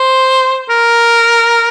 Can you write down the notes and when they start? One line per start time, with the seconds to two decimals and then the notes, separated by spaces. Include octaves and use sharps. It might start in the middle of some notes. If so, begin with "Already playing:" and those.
Already playing: C5
0.70 A#4